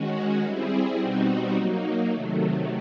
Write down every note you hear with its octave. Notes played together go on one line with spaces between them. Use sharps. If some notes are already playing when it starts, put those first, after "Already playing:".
Already playing: D#3 G#3 C#4 F#4
G3 C4 E4 G#4
B2 G3 C4 D#4 F#4
F#3 A#3 D#4
C3 D#3 F#3 A3